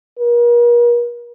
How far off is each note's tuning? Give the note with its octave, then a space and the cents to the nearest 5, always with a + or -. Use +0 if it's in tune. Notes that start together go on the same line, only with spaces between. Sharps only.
A#4 +40